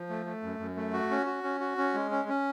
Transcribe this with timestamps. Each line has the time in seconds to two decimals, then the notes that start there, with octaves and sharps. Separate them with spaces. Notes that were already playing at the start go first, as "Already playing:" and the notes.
Already playing: F3
0.09 A3
0.26 A3
0.43 F#2
0.59 F#2
0.76 A3
0.93 F#4
1.11 C#4
1.26 F#4
1.44 C#4
1.61 F#4
1.78 C#4
1.94 G#3
2.11 C#4
2.29 C#4